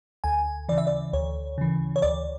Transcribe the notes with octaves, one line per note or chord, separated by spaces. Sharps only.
D2 G#5
C#3 E3 D5
E5
D5
D2 C#5
C#3 E3
C#5
D2 D5